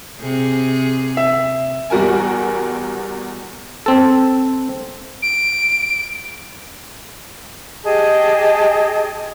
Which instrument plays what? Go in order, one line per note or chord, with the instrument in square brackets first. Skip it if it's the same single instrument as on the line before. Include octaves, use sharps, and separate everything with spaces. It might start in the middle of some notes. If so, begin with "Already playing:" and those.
[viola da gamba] C3 G#4
[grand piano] E5
[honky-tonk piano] E2 G3 F#4 A#4 G#5
[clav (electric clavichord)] C4 A4
[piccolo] D7
[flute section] G4 G#4 D#5 A5